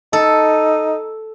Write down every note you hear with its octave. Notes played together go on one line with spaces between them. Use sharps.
D#4 A4